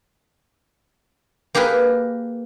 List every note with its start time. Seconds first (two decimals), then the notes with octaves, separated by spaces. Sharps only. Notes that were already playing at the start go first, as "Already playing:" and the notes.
1.55 A#3 G4 G#4 A#4 B4